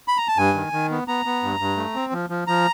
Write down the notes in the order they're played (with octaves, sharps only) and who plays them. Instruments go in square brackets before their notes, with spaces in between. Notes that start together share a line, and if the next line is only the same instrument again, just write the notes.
[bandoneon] B5
A#5
A5
G2 G#5
D#3
D#3
B3
B3 A#5
B3
G2
G2
A3
C4
F3
F3
F3 A#5